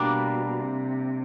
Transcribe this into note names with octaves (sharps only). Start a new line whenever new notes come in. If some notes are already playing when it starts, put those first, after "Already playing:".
Already playing: B2 G3 A#3 D4
C3